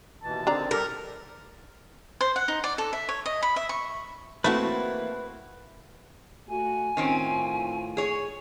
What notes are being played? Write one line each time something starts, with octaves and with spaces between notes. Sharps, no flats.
D#2 B2 E3 A5
D3 D#3 C4 D4 D5 A#5
G3 G4 A4 A#4
C5
F#5
D#4
D5
A4
E5
C#5
D#5
B5
E5
C#6
E3 A3 A#3 C4 E4 F#4 B4 A5
A3 F#4 G#5
A2 D#3 C4 C#4 F4
G#4 C#5